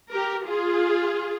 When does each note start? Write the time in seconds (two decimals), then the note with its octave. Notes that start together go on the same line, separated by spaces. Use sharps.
0.12 G4 A#4
0.48 F4 G#4